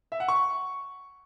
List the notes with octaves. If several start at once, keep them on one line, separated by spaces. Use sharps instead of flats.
E5
F#5
C#6